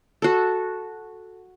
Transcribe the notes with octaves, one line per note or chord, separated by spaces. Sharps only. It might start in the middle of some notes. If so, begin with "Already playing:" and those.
F#4 A4